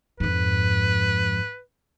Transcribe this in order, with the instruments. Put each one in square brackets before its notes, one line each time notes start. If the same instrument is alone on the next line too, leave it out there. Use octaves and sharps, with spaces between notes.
[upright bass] F2 G#2 [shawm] B4